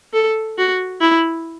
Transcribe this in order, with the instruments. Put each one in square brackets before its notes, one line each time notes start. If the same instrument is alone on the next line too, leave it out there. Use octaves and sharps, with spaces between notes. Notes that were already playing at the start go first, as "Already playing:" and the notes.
[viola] A4
F#4
E4